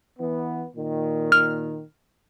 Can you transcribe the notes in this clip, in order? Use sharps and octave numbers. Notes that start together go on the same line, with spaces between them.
E3 B3
A#2 D#3
F6